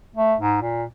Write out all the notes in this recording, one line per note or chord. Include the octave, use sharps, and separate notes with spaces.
A3
G#2
A#2